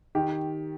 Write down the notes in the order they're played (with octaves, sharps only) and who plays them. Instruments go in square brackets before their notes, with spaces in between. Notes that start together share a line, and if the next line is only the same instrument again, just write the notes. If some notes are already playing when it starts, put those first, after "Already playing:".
[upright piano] D#3 G4